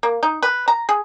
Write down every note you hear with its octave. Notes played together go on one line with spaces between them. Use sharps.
A#3
D#4
B4
A#5
G#4